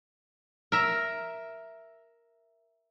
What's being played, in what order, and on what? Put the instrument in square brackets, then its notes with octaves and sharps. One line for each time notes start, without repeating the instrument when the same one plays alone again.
[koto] A#4 E5